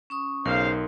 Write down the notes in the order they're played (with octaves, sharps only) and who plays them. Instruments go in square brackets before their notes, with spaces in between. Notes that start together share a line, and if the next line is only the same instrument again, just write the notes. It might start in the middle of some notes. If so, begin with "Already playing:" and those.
[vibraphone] C#4 C#6 D#6
[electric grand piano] B1 [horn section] C#3 C5 F5 [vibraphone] D#4 A#4 C6